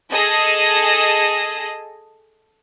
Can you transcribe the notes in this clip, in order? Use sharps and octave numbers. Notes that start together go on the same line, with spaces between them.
G#4 A4 D#5